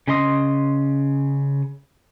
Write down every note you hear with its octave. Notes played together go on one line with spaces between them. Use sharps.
C#3 C#4 D#5 C6 D#6